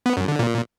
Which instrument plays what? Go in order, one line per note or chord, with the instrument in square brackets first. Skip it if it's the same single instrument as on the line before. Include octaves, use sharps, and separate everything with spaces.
[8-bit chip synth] B3
F#2
D3
A#2